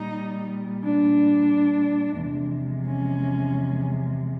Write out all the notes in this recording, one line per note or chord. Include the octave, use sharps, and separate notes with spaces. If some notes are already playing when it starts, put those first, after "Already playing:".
Already playing: A#2 G3 D#4
D4
E2 C3 F3 G#3
C#4